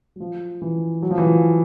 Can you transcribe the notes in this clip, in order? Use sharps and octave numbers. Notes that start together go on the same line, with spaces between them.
F#3
F3
E3
F#3
F3
E3
F3